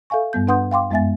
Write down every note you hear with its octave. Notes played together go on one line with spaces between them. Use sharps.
A4 E5 F5 G#5 C#6
G2 G3 B3 G6
D4 B4 F#5 C6 D#6 G6
F5 G5 C6 D6
F#2 G#3 B3 E5 G#5 A6